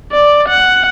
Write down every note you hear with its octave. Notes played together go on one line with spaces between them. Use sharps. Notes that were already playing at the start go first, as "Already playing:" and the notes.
D5
F#5